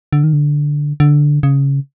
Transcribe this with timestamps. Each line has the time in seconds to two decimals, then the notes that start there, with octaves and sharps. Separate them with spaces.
0.13 D3
0.24 D#3
0.33 D3
1.00 D3
1.43 C#3